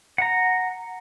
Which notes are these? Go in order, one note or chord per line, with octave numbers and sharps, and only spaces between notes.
F#5 A#5